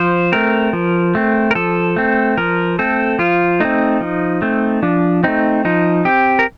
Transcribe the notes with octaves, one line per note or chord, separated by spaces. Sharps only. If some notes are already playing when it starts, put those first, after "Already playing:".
Already playing: F3 C5
A3 C4 A#4
F3
A3 C4
A#4
F3 A4
A3 C4
F3 A#4
A3 C4 A4
F3 F4
A3 C4 D#4
F3
A3 C4
F3 D4
A3 C4 D#4
F3 D#4
C4 G4
A#4